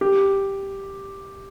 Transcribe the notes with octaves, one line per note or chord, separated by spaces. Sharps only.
G4